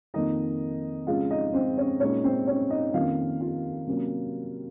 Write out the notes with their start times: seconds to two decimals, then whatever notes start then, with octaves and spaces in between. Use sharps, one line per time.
0.14 F2 D#3 A#3 D#4 D#5
1.07 F2 C#3 G#3 C#4 F4 F5
1.30 D#4 D#5
1.54 C4 C5
1.78 C#4 C#5
2.00 A#2 G#3 C#4 D#4 C#5
2.24 C4 C5
2.47 C#4 C#5
2.70 D#4 D#5
2.94 F2 D#3 A#3 C#4 F4 F5
3.41 F4 F5
3.87 C3 F#3 A#3 C#4